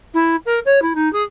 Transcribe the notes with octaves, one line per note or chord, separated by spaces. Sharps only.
E4
A#4
C#5
E4
D#4
G#4